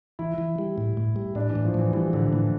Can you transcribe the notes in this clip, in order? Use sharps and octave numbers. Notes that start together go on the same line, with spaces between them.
E3 E4
E3
G3
A2
A2
G3
A2 D4
E3
A2
F3
A2 E3
E3 G3
A2 D3
A2 E3